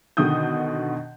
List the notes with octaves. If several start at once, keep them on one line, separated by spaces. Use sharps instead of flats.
B2 D3 D#3 D#6 G6